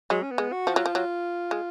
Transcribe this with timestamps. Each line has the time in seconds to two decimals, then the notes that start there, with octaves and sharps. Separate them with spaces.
0.10 F#3 G#3
0.23 C#4
0.31 B3
0.38 G#3
0.52 F#4
0.67 F3
0.74 F#3 F4
0.86 F3
0.95 F#3 F4
1.51 G#3